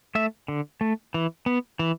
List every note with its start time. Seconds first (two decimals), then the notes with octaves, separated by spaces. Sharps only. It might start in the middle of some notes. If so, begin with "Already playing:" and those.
0.15 A3 E5
0.48 D3
0.81 A3
1.14 E3
1.46 B3
1.79 E3